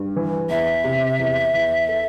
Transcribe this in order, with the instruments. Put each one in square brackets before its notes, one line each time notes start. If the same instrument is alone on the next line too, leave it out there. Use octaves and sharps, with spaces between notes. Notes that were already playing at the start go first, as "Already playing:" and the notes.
Already playing: [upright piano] G2
E3
[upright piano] E2 [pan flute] E5
[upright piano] C3
E2
E2
A4